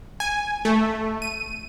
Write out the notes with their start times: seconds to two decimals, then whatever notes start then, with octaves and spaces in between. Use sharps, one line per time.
0.20 G#5
0.65 A3
1.22 D#7